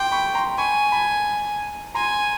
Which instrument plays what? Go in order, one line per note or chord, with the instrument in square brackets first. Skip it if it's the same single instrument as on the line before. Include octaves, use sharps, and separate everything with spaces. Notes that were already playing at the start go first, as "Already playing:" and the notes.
Already playing: [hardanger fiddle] G5 [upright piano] C6 D6
[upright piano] B5 C#6
A#5 C6
[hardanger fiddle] G#5 [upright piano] B5 C#6
[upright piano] A5 B5
[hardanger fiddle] G#5 [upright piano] A#5 C6